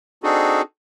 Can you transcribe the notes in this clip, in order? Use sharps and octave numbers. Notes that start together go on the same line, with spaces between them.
C4 D4 D#4 F#4 G#4 A4